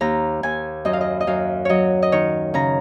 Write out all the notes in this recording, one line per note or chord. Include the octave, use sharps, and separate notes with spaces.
D#2 A#5
D#2 G#5
F#2 D#5
F5
D#5
D#5
F#2 F5
F#3 C#5 D#5
D#5
D#3 C#5
C#3 A#5